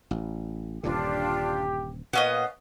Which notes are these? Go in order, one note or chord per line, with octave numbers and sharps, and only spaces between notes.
A1
D#1 G2 D3 D4 F4 G4
A#2 B3 C#4 D#5 F5